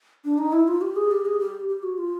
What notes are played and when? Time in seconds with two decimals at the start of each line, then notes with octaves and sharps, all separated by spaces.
0.25 D4
0.38 D#4
0.53 E4
0.68 F4
0.81 G4
0.96 G#4
1.11 G4
1.25 G#4
1.40 G4
1.68 G4
1.83 F#4
1.98 F4